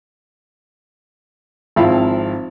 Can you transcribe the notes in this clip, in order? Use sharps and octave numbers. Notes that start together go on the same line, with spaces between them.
G#1 F3 C4 E4 F5 B5